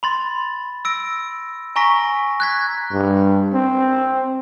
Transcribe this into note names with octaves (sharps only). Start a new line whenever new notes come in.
B5 C6 A6
E6 A#6 D7
G#5 A#5 C#6 A#6 B6 D7
F#6 G#6 B6
G2
C4